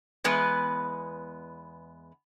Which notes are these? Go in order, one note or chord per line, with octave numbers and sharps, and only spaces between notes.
E2 G#3 B3 B4